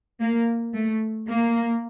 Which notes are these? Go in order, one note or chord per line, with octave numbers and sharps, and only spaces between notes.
A#3
A3
A#3